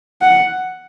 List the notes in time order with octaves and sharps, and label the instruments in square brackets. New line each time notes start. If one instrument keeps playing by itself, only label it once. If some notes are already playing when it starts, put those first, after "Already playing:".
[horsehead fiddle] F#5